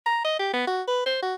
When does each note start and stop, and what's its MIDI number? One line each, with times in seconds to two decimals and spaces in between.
0.06 0.20 82
0.24 0.39 75
0.39 0.50 67
0.54 0.65 59
0.67 0.82 66
0.88 1.05 71
1.06 1.20 72
1.23 1.35 66